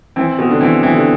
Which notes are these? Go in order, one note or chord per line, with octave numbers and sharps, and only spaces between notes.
E3 C4
B2
D3
E3 C4
E3 C4
D3